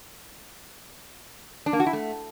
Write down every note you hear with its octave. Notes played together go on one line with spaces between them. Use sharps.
D4
A#3
F#4
E4
A3